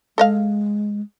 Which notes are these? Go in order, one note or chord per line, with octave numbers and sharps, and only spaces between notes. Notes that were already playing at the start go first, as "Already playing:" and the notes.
G#3 A4 D#5 F5